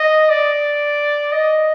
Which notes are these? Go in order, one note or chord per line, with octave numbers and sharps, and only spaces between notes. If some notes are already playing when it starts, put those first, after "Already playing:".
Already playing: D#5
D5
D#5